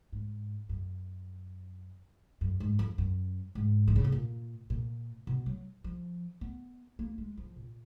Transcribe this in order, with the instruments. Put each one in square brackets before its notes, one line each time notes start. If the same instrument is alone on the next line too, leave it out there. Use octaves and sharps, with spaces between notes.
[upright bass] G#2
F#2
F#2
G#2
F2
F#2
G#2
D#3
C#3
B2
A#2
A#2
B2
F#3
F3
B3
A#3
G#3
F3
A#2